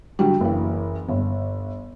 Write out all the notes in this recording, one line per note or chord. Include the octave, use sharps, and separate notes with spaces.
D3 F#3 G3
F#1 E3
G1